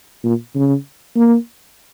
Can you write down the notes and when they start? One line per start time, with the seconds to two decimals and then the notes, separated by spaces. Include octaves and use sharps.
0.24 A#2
0.56 C#3
1.16 A#3